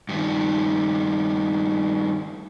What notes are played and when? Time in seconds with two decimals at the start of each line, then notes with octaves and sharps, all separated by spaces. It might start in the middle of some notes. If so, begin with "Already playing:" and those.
0.09 G2 D#3